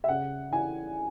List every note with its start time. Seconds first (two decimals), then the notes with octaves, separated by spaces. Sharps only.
0.04 E5
0.08 C#3 F#5
0.51 E3 G#5